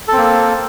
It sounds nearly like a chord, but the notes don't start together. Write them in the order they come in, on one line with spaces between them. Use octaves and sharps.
A4 C4 A#3